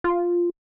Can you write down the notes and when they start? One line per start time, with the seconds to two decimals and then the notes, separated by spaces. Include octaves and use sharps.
0.04 F4